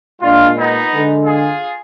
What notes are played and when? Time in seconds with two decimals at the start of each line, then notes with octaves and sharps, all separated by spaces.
0.22 A#2 G#3 D4 F4
0.57 B3 D#4
0.91 D3 G#3
1.25 F4 G#4